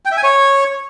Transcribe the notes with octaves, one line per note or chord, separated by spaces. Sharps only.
G5
E5
G#5
C#5